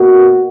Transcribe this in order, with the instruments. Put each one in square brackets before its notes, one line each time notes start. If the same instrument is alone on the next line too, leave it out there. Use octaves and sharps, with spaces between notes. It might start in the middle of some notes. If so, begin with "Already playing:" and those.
Already playing: [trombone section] B2 A#3 F#4